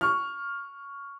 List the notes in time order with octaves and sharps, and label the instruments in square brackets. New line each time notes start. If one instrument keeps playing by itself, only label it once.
[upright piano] C#6 F6